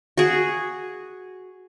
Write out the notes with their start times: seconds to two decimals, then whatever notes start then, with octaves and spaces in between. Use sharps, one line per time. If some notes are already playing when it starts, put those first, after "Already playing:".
0.18 F#4 G#4